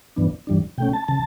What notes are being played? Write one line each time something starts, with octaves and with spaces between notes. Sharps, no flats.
G2 E3 B3 D4
G2 E3 G3 D4
B2 A3 C#4 G5
A5
C#3 A5